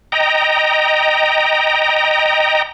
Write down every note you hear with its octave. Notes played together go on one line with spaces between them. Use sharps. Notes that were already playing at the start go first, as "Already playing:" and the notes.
D#5 G5 A#5